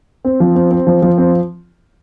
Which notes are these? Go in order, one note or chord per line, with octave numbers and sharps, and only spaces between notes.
C4
F3
C4
C4
F3
F3
C4